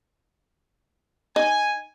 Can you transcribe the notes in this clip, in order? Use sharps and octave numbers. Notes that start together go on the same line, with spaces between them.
D#4 G#5